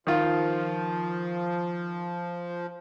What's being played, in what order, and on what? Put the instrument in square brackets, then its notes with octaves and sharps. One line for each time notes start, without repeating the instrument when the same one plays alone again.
[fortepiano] D#3 F4 [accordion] F3